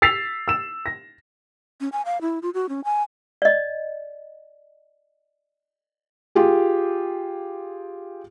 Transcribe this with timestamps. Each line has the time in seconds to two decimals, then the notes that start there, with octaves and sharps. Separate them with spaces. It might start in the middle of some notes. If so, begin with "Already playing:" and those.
0.02 E6 A6 B6 C7 F7
0.48 E6 E7
0.86 A#6
1.81 C#4
1.92 G#5
2.06 F5
2.21 E4
2.42 F4
2.54 F#4
2.69 C#4
2.84 G#5
3.42 D5 D#5
6.35 F4 G4 G#4